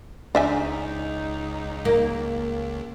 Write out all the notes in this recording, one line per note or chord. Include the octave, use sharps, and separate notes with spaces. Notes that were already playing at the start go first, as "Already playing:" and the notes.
C#2 D4 D#4 E5 G#5
A#3